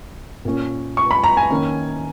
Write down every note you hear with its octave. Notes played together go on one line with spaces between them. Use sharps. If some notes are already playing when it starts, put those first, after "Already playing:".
A#2 A#3 C#4
C#6
B5
A#5
G#5
D#3 A#3 C#4